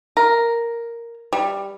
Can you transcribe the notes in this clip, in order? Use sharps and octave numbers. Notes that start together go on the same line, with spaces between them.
A#4
G3